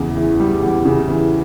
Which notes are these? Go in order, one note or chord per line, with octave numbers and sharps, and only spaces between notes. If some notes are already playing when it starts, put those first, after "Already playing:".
Already playing: E2 C#3
E3
G3
E2
C#3
E3